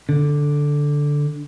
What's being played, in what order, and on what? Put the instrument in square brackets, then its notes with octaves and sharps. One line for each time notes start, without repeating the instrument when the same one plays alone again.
[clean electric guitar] D3